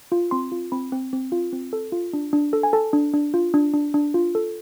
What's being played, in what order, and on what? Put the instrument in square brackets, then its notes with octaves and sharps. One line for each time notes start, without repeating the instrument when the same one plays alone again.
[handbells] F4
C4 C6
F4
C4 B5
C4
C4
F4
C4
A4
F4
D4
D4
A4
G#5
A4 A5
D4
D4
F4
D4
D4
D4
F4
A4